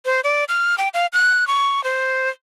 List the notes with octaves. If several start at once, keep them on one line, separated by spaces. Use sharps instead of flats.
C5
D5
F6
G5
F5
F#6
C#6
C5